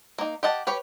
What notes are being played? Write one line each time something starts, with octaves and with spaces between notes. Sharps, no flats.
A#3 D#4
G4 D#5 F#5 A5
G4 B4 C#5